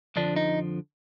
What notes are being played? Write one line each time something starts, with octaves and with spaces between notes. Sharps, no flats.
F2 D3 F3 D4
D#4